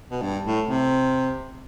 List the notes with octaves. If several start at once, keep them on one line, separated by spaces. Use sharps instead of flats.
B2
G2
A2
C3